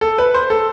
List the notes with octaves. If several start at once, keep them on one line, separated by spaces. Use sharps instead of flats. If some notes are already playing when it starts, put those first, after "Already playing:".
A4
B4
C5
A4